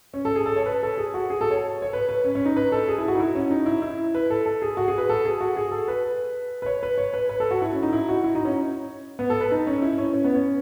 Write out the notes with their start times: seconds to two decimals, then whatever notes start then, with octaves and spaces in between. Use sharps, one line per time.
0.14 C#4
0.25 A4
0.35 G#4
0.46 A4
0.56 C#5
0.66 B4
0.83 A4
0.97 G#4
1.14 F#4
1.30 G#4
1.41 A4
1.50 C#5
1.82 C#5
1.93 B4
2.09 B4
2.24 C#4
2.35 C#4
2.45 D#4
2.56 B4
2.72 A4
2.88 G#4
2.98 E4
3.08 F#4
3.15 D#4
3.20 E4
3.35 C#4
3.51 D#4
3.66 E4
3.82 E4
4.14 B4
4.30 A4
4.46 A4
4.62 G#4
4.77 F#4
4.88 G#4
4.98 B4
5.09 A4
5.25 G#4
5.41 F#4
5.57 G#4
5.71 A4
5.88 B4
6.62 B4
6.66 C#5
6.83 B4
6.98 C#5
7.14 B4
7.29 B4
7.40 A4
7.51 F#4
7.62 E4
7.73 C#4
7.83 D#4
7.93 E4
8.09 F#4
8.24 E4
8.35 D#4
8.45 C#4
9.19 B3
9.30 A4
9.40 B4
9.52 D#4
9.67 C#4
9.82 E4
9.98 C#4
10.14 C#4
10.24 B3
10.35 C#4